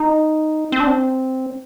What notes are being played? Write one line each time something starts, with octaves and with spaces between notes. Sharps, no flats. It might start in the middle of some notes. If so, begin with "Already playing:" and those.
Already playing: D#4
C4
D4
C4